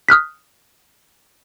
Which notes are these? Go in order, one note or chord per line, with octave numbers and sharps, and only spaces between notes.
D#6 F6 F#6 B6